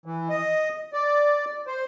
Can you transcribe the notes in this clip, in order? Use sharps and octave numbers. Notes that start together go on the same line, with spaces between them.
E3
D#5
D5
C5